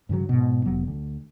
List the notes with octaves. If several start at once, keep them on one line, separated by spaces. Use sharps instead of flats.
G2 C#3 E3 F#3
G#2 B2
F1 F#3 B3
D2